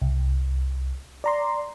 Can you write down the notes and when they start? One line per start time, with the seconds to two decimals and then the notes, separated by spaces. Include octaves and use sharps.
0.02 C2
1.24 D5 A#5 C6